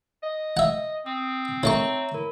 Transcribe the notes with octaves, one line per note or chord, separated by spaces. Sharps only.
D#5
E5 F#5
C4 D#6
D#3 A3 C#5 E5 A#5 C#6
E4 A#4